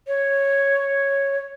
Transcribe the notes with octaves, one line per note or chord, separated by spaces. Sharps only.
C#5